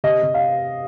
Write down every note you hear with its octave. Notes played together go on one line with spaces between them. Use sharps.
C3 D#5
C3
F5